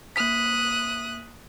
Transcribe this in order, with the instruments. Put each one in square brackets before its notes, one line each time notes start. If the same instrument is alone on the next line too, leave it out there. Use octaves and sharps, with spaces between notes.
[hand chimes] A#3 B6 [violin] D#6 F#6